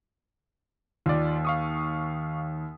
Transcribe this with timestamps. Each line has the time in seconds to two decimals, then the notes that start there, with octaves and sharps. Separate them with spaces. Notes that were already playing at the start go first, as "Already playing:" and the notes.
1.06 D#2 F4 D5
1.45 F5 C#6 D#6